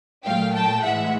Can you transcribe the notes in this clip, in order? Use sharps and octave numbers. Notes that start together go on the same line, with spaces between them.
A#2 F#3 A3 F5 G5
G5 A5
A2 E3 G#3 E5 F#5